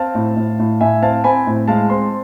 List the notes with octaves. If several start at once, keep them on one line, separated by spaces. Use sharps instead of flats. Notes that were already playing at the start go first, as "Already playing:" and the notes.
Already playing: C4 F5 A5
A2
A2
A2
A2 E5 G#5
C4 F5 A5
C4 G#5 B5
A2
G#3 F5 A5
C4 A5 C6